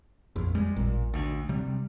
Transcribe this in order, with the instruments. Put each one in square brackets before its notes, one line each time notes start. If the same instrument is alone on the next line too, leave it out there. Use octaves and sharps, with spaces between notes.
[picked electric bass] A#1 [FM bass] F2
[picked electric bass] G3 G#3
[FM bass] A1 [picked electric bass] A#2
[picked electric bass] D2
C3 G3